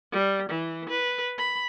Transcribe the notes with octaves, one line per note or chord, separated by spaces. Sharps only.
G3
E3
B4
B5